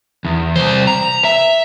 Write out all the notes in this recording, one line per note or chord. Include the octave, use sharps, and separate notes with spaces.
E2
C2 C5
A#5
E5